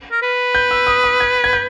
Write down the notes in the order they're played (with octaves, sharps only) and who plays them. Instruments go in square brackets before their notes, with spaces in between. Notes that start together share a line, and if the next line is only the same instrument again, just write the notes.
[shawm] A#4
B4
[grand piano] G6
E6
D#6
D#6
G#6
G#6
G6